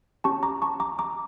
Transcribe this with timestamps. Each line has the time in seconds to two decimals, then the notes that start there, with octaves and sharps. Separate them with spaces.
0.24 C#4 G4 A5 C#6
0.43 A#5 D6
0.62 A5 C#6
0.80 A#5 D6
0.99 A#5 D6